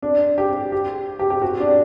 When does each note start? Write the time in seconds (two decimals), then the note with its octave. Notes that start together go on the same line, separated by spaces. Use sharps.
0.02 D4
0.38 G4
0.72 G4
1.19 G4
1.30 G4
1.42 F#4
1.60 D4